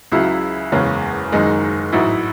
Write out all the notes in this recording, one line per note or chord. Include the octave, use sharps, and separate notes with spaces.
C#2 C#3 F#3 E4
F#1 E2 C#3 G#3 C#4
F#1 F#2 D#3 G#3 D#4
A1 G#2 F#3 E4